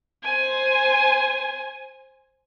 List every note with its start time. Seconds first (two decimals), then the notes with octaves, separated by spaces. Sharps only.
0.23 C5 G#5